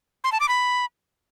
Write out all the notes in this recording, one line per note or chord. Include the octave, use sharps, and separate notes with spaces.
C6
A5
D6
B5